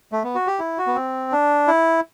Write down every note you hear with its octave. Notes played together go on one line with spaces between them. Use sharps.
A3
B3
F#4
G4
E4
F#4
B3
C4
D4
E4